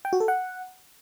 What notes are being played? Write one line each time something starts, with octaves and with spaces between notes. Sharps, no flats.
G5
F#4
A4
F#5